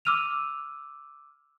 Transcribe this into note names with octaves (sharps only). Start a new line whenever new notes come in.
D6 E6 F6 D#7 F7